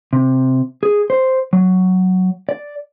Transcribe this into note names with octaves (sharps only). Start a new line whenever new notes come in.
C3
G#4
C5
F#3
D5